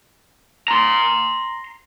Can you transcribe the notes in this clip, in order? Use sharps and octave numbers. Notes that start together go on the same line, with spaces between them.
A#5 C6